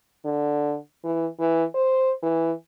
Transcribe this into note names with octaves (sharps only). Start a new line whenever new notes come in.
D3
E3
E3
C5
E3